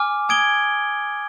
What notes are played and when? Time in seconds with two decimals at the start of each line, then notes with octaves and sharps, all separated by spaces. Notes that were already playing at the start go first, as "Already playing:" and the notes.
Already playing: G#5 D6 F6
0.29 G#5 D#6 G#6 D7 G7